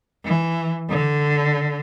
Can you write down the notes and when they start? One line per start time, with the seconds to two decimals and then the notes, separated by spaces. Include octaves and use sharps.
0.25 E3
0.89 D3